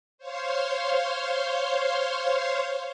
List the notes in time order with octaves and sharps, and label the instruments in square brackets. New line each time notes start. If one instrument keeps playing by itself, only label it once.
[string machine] C5 C#5 F5 C6